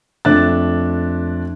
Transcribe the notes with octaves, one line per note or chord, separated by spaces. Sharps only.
F2 A3 D4 E5 F#6 A6